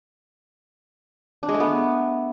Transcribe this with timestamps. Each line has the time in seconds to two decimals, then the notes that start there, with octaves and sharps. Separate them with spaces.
1.43 D4
1.49 G#3
1.54 A3
1.60 B3